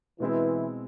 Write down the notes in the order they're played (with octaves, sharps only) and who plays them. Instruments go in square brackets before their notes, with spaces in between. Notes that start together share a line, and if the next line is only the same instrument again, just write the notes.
[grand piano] B2 G#3 C4 E4 [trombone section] E3